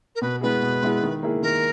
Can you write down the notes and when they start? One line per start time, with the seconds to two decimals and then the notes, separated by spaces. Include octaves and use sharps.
0.15 A#4
0.21 B2 B4
0.41 G#3 B3 E4 G#4 B4
0.62 B2
0.82 G#3 B3 E4 G#4
1.02 D#3
1.23 A#3 E4 G#4
1.42 D#3 A#4